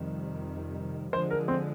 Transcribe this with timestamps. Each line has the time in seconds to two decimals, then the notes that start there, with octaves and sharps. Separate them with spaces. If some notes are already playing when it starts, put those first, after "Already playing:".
Already playing: F2 C3 D#3 G3
1.13 D3 F3 G#3 C5
1.30 A#4
1.48 C4